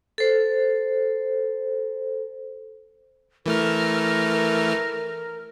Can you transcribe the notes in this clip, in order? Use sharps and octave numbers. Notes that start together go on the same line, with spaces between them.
A4 C5
E3 A3 A#4 F6